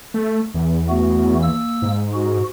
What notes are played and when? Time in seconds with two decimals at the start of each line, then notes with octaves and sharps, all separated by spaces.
0.14 A3
0.54 E2
0.89 A3 B3 F#4
1.42 A#3 E6
1.82 G#2
2.13 F#4